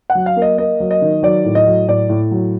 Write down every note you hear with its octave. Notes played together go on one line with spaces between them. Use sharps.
F#5
F#3
F5
A#3
D#5
A#3 D#5
F#3
D#5
D#3
F#3 D5
A2
D#5
F#3
A2 D5
A2
F#3